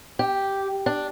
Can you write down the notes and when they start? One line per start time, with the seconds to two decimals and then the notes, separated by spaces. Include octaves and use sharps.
0.19 G4
0.86 D4